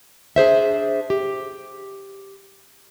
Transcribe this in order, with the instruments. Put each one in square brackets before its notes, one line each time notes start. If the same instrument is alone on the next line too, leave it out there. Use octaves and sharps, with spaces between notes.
[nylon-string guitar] D4 G#4 C5 E5
G4